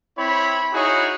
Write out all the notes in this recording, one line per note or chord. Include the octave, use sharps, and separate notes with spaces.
C4 E4 C#5 B5
D#4 E4 F#4 G#4 C#5